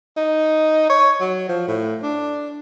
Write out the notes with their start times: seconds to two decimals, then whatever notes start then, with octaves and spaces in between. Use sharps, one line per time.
0.17 D#4
0.90 C#5
1.20 F#3
1.48 F3
1.68 A2
2.03 D4